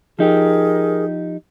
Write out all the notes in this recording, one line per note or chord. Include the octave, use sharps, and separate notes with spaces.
F3 D#4 G4 G#4 A#4